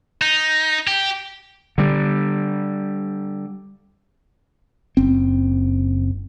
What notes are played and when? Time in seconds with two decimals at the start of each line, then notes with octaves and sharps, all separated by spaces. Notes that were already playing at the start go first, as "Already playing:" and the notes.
0.21 D#4
0.87 G4
1.78 D3 G3
4.97 F#1 C4